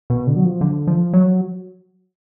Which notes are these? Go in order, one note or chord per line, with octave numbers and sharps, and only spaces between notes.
B2
D3
F#3
F3
D3
F3
F#3